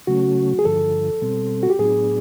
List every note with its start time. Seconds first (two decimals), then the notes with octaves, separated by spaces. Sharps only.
0.07 C#3 F#3 A3 C#4 F#4
0.59 G#4
0.64 G2 D3 F3 A4
1.22 B2 G3 C4
1.63 F#4
1.70 G4
1.79 A2 F#3 B3 D4 G#4